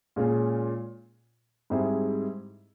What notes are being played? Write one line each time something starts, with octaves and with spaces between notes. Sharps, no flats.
A#2 G#3 C#4 F4 G#4
G#2 G3 C4 E4 G#4